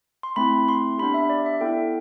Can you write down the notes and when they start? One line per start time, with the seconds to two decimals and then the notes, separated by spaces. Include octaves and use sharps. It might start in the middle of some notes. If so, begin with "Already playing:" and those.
0.23 C6
0.36 A3 C4 E4 B5
0.68 C6
0.98 B3 D4 G4 B5
1.14 E5
1.30 D5
1.46 E5
1.61 B3 E4 A4 G5